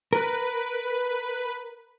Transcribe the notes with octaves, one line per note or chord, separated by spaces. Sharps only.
A#4 B4